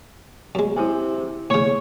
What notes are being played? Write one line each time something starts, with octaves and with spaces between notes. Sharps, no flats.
F#2 G#3
C3 E4 C5 G#5
A2 C#3 C#5